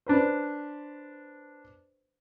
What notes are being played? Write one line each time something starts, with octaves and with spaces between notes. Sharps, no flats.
D4 B4 C5